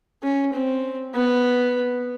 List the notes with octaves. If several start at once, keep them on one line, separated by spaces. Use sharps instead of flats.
C#4
C4
B3